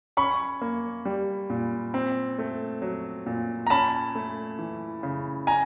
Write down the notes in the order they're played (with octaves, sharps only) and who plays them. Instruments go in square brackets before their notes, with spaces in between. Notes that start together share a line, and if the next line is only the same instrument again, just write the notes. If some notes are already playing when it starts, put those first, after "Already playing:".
[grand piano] C#4 B5 C#6
A#3
G3
A#2
C4
A3
F#3
A#2
A#5
C#4 A5 B5
A3
E3
C#3
G#5 A#5